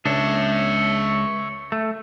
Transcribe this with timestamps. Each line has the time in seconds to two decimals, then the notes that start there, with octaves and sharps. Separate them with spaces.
0.06 C#2 D4 C#5 E5
1.72 A3